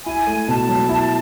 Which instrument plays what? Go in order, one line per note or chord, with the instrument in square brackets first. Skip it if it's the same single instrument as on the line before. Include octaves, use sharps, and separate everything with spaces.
[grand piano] E4 [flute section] G#5
[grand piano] A3
[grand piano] B2 [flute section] A5
[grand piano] F#3
E4